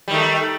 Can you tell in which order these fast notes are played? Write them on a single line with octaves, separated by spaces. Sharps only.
G3 D#3 A3